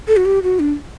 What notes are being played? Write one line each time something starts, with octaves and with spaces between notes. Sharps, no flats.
A4
F#4
G4
F#4
D4